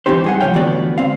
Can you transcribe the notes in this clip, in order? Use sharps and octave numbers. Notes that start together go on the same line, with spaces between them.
E3 C4 D#4 G4 C5
G2 G#4 F#5
C#2 C#3 F3 C#5 F5 G5
E2 A2 D3 B3 F#4 D5
C#2 C4 F5